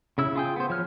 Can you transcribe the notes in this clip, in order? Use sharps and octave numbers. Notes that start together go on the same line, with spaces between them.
C#3 E4 E6
F4 G#4 G5
B3 C5
F3 C#5 F6